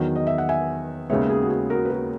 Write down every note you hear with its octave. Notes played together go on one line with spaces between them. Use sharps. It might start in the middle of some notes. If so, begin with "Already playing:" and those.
Already playing: E2 D#3 F#3
D#5
E5
F#5
E5 G#5
D#2 C#3 G#3 B3 C#5 E5
G#4
F#4
G#4
F#4 A#4
B4
F#4 A#4